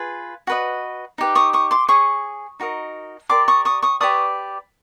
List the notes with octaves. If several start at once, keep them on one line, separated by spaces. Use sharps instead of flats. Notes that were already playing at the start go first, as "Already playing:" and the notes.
Already playing: F4 G#4 B4
F#4 B4 D#5
D#4 G4 B4
C#6 D#6
C#6 D#6
C6 D6
G#4 C#5 C#6 D#6
D#4 F#4 A#4 D#5
G4 A#4 D5 C6 D6
C#6 D#6
C#6 D#6
C#6 D#6
G4 B4 D5 C#6 D#6